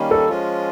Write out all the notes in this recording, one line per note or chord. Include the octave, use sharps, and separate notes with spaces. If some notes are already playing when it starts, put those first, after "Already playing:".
Already playing: D#3 G3 A#3 C#4
A4
F3 G#3 C#4 F4